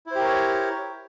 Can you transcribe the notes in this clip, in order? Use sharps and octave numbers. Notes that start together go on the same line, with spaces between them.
E4 G4 A#4 C5 C#5